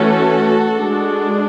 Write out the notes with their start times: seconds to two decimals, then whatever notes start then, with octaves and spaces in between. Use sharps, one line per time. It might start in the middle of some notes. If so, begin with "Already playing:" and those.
Already playing: E3 A3 C#4 F#4 A4
0.75 G#3 D4